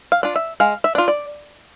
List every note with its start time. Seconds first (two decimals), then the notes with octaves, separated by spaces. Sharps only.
0.12 F5
0.23 D4 F4
0.36 E5
0.60 G#3 F5
0.84 E5
0.95 D4 F4
1.08 D5